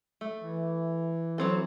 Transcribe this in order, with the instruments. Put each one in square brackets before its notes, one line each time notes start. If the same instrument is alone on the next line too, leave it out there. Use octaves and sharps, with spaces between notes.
[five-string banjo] A3
[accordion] E3
[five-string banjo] F#3 C4 A4